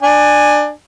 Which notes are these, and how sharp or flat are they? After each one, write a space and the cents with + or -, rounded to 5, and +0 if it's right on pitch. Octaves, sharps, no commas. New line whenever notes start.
D4 +20 G#5 +0